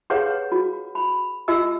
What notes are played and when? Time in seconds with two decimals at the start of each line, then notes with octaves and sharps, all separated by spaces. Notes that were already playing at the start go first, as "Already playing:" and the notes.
0.10 G4 G#4 B4 C#5 F5 F#5
0.52 F#4
0.95 B5
1.48 F4 G4 D#5 E6